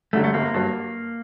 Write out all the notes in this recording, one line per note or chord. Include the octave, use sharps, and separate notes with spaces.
F#2 D3 G3 A3
A3
G1 A#3
G2 F#3